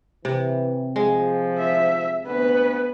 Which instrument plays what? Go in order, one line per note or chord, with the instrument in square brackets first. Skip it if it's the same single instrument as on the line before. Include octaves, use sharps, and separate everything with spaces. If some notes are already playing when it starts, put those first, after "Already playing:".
[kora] C3 [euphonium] E3
[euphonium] F3 [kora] G#3
[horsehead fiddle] E5
[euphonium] D2 [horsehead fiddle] B3 B4